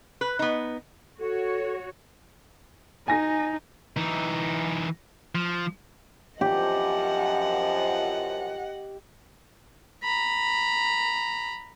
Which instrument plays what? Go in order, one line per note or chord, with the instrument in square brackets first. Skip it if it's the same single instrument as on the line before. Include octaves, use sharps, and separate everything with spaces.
[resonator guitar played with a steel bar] B4
B3 D#4
[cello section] F#4 C#5 [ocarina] A4
[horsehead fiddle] D#4 [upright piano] G#5 A#6
[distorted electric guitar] E3 D#4
F3
[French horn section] F#2 F3 [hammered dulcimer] G4 [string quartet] D#5 F#5
[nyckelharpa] A#5 B5